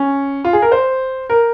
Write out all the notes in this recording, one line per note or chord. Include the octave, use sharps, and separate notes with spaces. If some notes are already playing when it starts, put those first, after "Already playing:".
Already playing: C#4
F4
G#4
A#4
C5
A#4